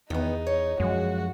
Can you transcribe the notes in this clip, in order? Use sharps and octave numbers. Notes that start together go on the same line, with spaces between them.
E2 D#3 B3 D#4
C#5
F#2 F3 G#3 F#4